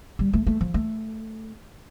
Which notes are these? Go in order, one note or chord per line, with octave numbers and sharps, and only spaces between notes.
G3
A3
A3
F3
A3